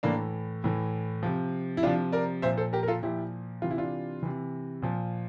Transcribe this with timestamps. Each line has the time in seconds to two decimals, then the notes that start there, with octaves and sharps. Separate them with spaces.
0.03 A2 E3 A#3 D4
0.64 A2 E3
1.23 C3 F3
1.77 E4
1.83 C3 F3 D4 F4
2.12 A#4 D5
2.42 A#2 C5 E5
2.46 F3
2.57 A4 C5
2.73 G4 A#4
2.83 A#4
2.88 F4 A4
3.03 A#2 F3 E4 G4
3.62 C3 E3 F4
3.71 E4
3.77 D4 F4
4.23 C3 E3
4.82 A#2 F3